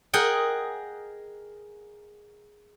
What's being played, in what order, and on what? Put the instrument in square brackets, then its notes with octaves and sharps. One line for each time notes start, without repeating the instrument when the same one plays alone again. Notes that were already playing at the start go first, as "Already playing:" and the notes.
[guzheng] G#4 A#4 D#5 F#5 G5